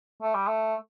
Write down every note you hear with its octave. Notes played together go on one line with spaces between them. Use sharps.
A3
G3
A3